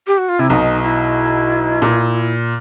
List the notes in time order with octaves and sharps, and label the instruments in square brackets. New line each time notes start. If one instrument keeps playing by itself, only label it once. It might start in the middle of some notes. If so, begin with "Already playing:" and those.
[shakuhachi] G4
F#4
F4
[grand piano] C3 [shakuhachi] E4
[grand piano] B1 B2 [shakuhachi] D#4
[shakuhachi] E4
[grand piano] A#2